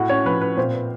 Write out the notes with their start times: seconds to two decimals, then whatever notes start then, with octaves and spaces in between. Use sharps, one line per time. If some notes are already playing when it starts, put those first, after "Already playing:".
Already playing: A2 F#4 F#5
0.09 C#4 C#5
0.25 F3 B4
0.41 B4
0.57 A#2 C4 C5
0.74 B4